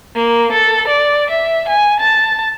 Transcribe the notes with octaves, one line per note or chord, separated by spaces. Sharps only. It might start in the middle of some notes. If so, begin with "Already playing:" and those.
A#3
A4
D5
E5
G#5
A5